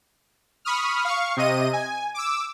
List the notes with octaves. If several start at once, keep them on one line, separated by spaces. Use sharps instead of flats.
B5 C#6 D#6 F6
F5 C#6
C3 D#5 D#7
G#5
D6 E6